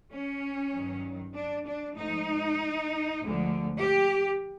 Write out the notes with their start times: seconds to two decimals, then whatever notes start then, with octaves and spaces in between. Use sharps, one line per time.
0.12 C#4
0.73 G2 D#3 F#3
1.35 D4
1.66 D4
1.96 G#2 F3 A3 D#4
3.19 D2 D3 F3 G#3
3.80 G4